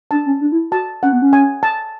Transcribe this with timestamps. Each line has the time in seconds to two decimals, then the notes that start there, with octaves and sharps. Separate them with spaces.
0.11 D4 A5
0.26 C#4
0.41 D4
0.52 E4
0.71 F#4 A5
1.03 C#4 F#5
1.12 B3
1.22 C#4
1.33 G#5
1.63 A5